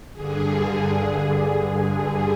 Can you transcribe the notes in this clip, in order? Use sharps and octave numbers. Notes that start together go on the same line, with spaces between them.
G2 D3 G#4